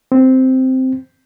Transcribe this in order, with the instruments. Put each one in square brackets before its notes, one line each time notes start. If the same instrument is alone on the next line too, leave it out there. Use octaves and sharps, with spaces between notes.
[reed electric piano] C4